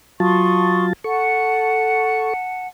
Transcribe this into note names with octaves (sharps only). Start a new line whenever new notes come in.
F#3 F4 A5 C6 C#6 D#6
A4 F#5 A5 C#6